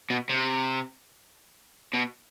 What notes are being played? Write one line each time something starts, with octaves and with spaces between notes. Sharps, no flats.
B2
C3
B2